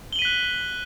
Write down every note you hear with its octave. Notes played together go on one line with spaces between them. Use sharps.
F#6 B6 D#7 F#7 G7